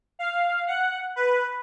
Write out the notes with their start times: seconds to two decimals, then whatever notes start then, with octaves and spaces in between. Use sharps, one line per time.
0.19 F5
0.68 F#5
1.16 B4